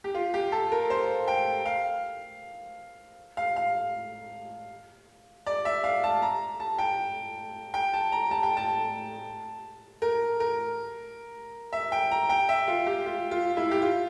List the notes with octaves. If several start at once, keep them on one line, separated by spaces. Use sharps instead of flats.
G4
F4
G4
A4
A#4
C5
G5
F5
F5
F5
D5
E5
F5
A5
A#5
A5
G5
G5
A5
A#5
A5
G5
A5
A#4
A#4
E5
G5
A#5
G5
E5
F4
G4
F4
F4
E4
G4
F4